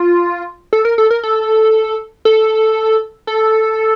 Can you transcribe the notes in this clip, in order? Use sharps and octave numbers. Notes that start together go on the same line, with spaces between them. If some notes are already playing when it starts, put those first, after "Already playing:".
Already playing: F4
A4
A#4
A4
A#4
A4
A4
A4